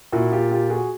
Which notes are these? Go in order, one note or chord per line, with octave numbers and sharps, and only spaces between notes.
A#2 E4 F#4
F4 G4
F4 G4
F#4 G#4